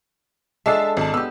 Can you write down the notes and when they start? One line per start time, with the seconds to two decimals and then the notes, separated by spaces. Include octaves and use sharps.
0.66 G#3 D4 A4 E5 A5 C7
0.97 G#1 A5
1.14 B3 G4 E6